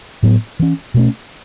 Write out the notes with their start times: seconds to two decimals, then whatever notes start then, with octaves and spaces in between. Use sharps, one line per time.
0.23 A2 F#3 B3
0.59 E3 C#4
0.94 B2 A3 C#4